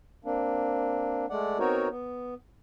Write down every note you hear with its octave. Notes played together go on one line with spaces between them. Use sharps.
A#3 C4 D4
G#3 A3 D5 F#5
B3 C4 D#4 F#4 A#4 C#5
B3